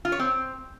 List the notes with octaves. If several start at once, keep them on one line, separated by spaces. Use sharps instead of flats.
F4
C#5
C4